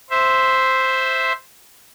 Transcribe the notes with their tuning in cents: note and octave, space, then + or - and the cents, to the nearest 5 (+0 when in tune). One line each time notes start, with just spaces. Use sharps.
C5 +0 E5 +0